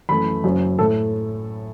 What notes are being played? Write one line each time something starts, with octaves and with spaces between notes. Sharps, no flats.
F#2 E3 A3 B5
F#1 F#2 F#3
A2 A3 A4